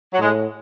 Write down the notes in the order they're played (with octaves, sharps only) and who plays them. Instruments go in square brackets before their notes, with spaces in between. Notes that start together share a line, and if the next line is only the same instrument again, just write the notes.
[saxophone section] F#3
[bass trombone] A2 [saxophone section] G#3